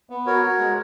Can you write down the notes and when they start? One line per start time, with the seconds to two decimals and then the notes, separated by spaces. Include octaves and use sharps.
0.10 B3
0.26 F#4 A#4 C#5
0.42 F#4
0.59 G#3